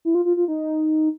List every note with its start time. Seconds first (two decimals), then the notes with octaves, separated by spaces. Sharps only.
0.05 E4
0.15 F4
0.25 F4
0.37 F4
0.48 D#4